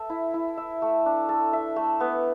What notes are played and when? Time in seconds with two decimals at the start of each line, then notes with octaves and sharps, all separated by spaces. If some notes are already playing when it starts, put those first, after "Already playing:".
Already playing: A4 E5
0.10 E4
0.34 E4
0.58 E5
0.82 A3
1.06 D4
1.29 A4
1.53 E5
1.76 A3
2.00 B3